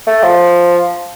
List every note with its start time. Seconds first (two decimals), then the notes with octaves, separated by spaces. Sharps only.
0.07 A3
0.23 F3